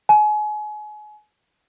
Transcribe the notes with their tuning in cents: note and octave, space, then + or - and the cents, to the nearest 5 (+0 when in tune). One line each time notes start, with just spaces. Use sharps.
G#5 +30